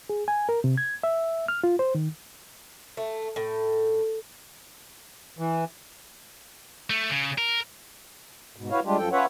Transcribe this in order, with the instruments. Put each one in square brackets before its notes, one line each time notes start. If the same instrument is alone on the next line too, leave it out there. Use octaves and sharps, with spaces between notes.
[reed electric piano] G#4
G#5
A#4
C3
G#6
E5
F6
F4
C5
D#3
[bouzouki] A3
A2
[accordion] E3
[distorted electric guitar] A3
C#3
A#4
[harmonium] G#2 B2
E4 F#4 B4 C#5 F5
G3 G#3 D4 F4 G4
F#2 F3 A4 G5
C#4 F4 B4 C#5 E5 F#5